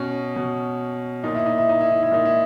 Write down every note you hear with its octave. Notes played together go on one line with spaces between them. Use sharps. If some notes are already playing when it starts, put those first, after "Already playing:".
Already playing: B2 C#4
B2
A#2 D#4
E4
D#4
E4
D#4
E4
D#4
E4
A#2 D#4
E4